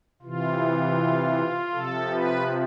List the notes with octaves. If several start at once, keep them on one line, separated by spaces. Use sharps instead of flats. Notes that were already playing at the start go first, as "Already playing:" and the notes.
C3 E3 F4
C3 F3 A4
B4